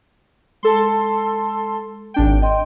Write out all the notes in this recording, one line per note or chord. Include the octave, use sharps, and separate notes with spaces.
G#3 A4 A5 C6
G#1 D4 G5
D#5 G5 C6